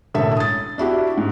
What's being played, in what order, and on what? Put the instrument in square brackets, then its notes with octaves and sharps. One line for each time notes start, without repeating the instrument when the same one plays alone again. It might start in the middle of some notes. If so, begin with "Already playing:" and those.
[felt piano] E1 A1 D3 A4 E5
D#6 A6
D4 E4 F#4 G4
G#2